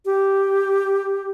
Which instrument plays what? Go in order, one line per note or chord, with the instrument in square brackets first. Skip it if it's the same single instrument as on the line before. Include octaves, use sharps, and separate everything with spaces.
[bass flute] G4